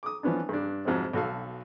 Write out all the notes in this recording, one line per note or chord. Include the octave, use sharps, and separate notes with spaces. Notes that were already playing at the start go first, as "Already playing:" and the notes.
D6 D#6
E3 F3 B3 C#4 D4
G2 D4
F2 G#2 C3 F#3 G#3 C4
B1 F#4 A4 F5